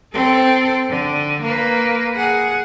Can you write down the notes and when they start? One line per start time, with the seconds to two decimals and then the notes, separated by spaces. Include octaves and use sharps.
0.13 C4 A4
0.90 D3
1.41 A#3 B4
2.16 G#4 F#5